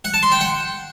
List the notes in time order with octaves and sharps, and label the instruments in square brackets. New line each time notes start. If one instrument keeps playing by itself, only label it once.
[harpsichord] F#5
A5
C6
G5
F#5